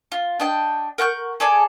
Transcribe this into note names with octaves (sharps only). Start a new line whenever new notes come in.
F4
D4 D#5 G5
A#4 F#5 C#6 G6
G#4 A4 D5 G#5